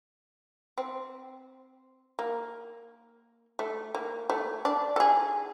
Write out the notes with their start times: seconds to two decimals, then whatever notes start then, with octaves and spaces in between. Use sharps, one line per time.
0.78 C4
2.19 A#3
3.59 A3
3.95 A#3
4.30 A3
4.65 D4
4.96 A4
5.00 G#4